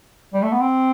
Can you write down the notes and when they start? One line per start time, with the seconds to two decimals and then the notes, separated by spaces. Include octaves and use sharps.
0.34 G3
0.43 A3
0.52 B3
0.61 C4